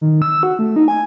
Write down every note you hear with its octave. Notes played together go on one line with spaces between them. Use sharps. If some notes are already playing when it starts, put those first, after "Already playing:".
D#3
E6
F#4
A3
D#4
G#5